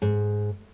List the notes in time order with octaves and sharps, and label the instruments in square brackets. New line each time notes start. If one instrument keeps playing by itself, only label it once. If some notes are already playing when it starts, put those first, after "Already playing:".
[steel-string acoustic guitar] G#2